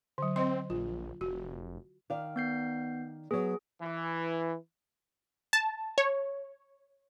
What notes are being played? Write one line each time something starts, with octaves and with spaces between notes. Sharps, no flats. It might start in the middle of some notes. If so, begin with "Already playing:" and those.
D3 F#3
C4 C5 D#5 C6
A#1 F4
F1 F#4
D#3 D5 F5
B3 G6 C7
F#3 B3 G#4
E3
A5
C#5